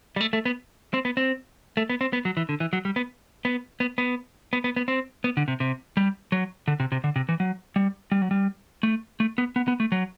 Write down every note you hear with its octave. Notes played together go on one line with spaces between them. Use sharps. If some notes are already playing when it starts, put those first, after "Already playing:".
G3
A3
A3
B3
C4
B3
C4
A3
B3
C4
B3
F#3
E3
D3
E3
F#3
G3
B3
B3
B3
B3
B3
B3
B3
C4
B3
D3
C3
C3
G3
F#3
D3
C3
C3
D3
C3
E3
F#3
G3
G3
F#3
G3
A3
A3
B3
B3
B3
A3
F#3